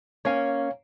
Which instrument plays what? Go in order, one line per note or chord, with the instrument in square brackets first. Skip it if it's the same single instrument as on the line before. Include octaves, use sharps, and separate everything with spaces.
[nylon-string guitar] A#3 C#4 G#5 [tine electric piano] C#5 F5